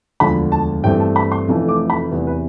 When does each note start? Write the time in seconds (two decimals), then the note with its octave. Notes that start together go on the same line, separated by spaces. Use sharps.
0.20 E1 D2 D3 F3 B5
0.52 A5
0.84 G2 E3 A3 C4 G5
1.00 A5
1.16 B5
1.32 C6
1.48 F1 F2 E3 A3
1.69 D6
1.90 B5
2.11 E2 C3 E3 B3
2.27 B4